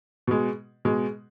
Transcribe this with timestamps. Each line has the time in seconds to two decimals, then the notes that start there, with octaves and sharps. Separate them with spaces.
0.27 B2 G#3
0.85 B2 G#3